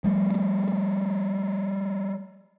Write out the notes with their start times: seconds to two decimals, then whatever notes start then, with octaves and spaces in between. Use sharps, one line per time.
0.04 F3 G3 A3